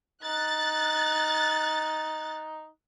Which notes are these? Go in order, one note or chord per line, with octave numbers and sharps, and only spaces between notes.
D#4 F#6 A6